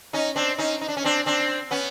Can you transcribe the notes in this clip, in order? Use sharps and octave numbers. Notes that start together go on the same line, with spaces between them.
C#4 D#4
C4 D4
C#4 D#4
D#4
D4
C#4
C4 D4
C4 D4
B3 C#4